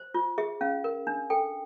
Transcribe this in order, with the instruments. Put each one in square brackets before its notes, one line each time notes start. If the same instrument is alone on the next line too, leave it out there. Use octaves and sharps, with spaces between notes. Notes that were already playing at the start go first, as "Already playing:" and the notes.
Already playing: [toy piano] C5
F4
G#4 E5
C#4 F5
A#4
D4
A4 G5